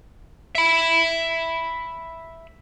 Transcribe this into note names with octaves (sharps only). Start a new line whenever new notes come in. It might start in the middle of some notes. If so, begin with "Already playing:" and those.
E5 B5